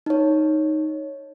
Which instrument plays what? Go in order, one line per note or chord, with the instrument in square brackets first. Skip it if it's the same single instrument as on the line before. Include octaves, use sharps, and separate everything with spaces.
[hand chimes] D#4 C#5